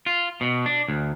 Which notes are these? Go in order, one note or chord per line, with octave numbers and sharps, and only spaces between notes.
F4
B2
D4
D2